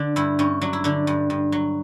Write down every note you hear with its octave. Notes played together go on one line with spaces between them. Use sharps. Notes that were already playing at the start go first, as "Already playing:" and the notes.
Already playing: D3 D4
G2 E4
G2 C#4
F#3 D4
E4
D3 D4
G2
G2
F#3